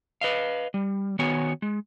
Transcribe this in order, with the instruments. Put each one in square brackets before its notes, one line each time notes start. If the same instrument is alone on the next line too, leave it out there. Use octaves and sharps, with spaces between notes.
[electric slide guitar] B4 D#5 F5
G3
D#3 B3 F#4 C#5 G#5
G#3